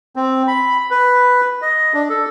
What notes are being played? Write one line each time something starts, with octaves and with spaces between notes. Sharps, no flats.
C4
B5
B4
D#5
D4
A4